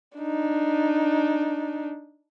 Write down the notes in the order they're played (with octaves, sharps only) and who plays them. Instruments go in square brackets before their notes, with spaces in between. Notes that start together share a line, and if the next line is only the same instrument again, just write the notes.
[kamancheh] D4 D#4